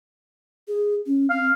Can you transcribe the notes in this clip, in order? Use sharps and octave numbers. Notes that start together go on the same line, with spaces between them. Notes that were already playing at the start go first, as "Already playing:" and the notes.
G#4
C#4
C4 F5